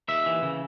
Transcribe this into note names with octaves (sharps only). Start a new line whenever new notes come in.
D#2 E5
E3
C#3